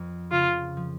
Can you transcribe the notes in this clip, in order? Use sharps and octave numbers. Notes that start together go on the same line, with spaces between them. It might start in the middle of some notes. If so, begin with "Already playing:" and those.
Already playing: F2 F3
C#3 F4
F3